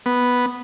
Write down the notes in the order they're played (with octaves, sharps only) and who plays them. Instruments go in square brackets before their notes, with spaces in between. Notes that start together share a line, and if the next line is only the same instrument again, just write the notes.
[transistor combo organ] B3